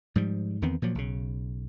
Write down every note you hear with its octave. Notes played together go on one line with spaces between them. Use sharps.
G#2 F3 G3
E2 D#3 B3 C4
A#2 F3 F#3
B1 C#3